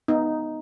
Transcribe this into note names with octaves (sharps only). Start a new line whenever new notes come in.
B3 D#4